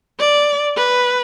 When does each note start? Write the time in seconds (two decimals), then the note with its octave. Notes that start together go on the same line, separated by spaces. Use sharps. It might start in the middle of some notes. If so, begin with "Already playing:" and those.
0.19 D5
0.77 B4